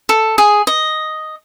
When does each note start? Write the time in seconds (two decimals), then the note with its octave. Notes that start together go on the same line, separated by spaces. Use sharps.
0.09 A4
0.38 G#4
0.67 D#5